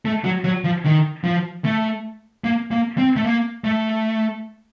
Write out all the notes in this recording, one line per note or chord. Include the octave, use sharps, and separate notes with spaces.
A3
F#3
F#3
F3
D#3
F3
A3
A#3
A#3
C4
A3
A#3
A3